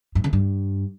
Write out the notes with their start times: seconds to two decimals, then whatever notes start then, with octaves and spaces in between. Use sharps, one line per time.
0.15 G2
0.24 C#3
0.33 G2